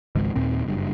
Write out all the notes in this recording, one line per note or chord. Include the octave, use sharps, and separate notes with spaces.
G#1 C#2 G#2
D#2 A#2 C4
F#1 G2